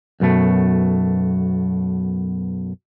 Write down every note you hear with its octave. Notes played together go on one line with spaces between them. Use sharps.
B1 F#2 B2 A3